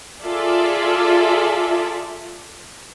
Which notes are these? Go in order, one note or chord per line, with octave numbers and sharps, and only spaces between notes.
F4 G#4 A4 D5 E5